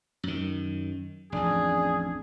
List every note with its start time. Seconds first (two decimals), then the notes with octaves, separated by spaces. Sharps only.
0.23 F#2 D#3
1.32 A1 F2 D4 G#4